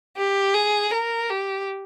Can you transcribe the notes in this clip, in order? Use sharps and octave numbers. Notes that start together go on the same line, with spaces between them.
G4
G#4
A#4
G4